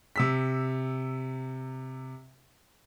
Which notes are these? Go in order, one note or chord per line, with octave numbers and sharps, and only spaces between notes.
C3 E6 B6